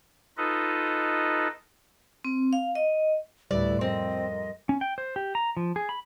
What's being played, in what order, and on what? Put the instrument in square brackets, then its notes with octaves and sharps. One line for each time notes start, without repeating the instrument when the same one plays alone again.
[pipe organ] D#4 F4 A4 B4 D#5
[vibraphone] C4
F5
D#5
[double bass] D2 A2 [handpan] G3 [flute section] E4 B4 [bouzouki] D5
[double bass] F2 [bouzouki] C4 [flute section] A#4 D#5 C6
[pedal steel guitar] C#4
G5
C5
G4
A#5
F3
G#4
B5